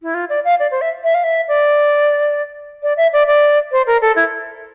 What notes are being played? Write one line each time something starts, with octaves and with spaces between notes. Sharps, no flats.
E4
F4
D5
F5
D5
C5
E5
E5
F5
E5
D5
D5
E5
D5
D5
C5
A#4
A4
E4